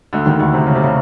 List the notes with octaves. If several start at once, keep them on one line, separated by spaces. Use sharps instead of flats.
D2 D3
D#2 D#3
D2 D3
C3
C#3
C3
C#3